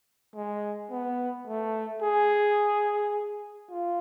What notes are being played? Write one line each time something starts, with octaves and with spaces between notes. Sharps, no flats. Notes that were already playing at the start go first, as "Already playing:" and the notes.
G#3
B3
A3
G#4
F4